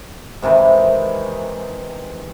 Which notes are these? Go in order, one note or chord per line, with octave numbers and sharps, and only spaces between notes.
G#2 C3 D#3 E3